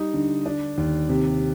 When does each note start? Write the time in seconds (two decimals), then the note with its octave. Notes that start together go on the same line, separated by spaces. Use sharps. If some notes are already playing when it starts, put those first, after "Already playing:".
Already playing: G3 D#4
0.14 D3
0.46 D4
0.78 D#2
1.09 C3